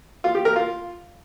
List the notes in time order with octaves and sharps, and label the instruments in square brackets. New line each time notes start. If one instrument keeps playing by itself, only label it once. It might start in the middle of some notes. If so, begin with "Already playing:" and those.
[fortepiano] F4
G4
A#4
F4